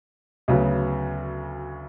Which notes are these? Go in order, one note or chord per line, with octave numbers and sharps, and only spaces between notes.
D2 C#3 F#3 B3